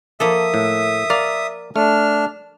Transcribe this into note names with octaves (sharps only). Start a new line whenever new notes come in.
F3 A#3 A4 E5 D#6
A2
A#4 D5 F5
A3 D4 F6